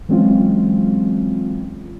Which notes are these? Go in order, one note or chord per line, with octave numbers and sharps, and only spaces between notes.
E3 F#3 G#3 C4 C#4 F4